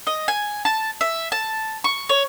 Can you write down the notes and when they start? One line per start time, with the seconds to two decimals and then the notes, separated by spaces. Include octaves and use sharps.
0.07 D#5
0.28 G#5
0.65 A5
1.01 E5
1.32 A5
1.84 C#6
2.09 C#5